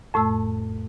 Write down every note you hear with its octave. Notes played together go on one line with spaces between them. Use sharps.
F2 A2 A3 E6